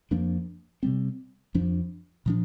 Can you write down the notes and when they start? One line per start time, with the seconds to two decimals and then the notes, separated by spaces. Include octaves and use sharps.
0.11 F2 F3 A#3 D4
0.83 C3 G3 C4
1.54 F2 F3 D4
2.26 A#2 F3 D4